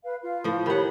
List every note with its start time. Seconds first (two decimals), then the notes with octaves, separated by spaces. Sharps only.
0.04 B4 F5
0.22 F4 F5
0.44 A2 F3
0.66 D#3 G4 C#5 F#5 B5